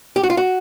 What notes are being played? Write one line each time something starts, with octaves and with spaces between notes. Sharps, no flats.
G4
F#4
F4
F#4